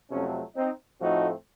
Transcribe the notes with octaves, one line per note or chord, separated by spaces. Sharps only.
F2 C3 F#3 A3 C#4
C4 D#4
A2 F3 A3 C4 D#4 F#4